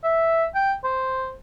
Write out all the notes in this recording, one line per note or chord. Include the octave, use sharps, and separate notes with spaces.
E5
G5
C5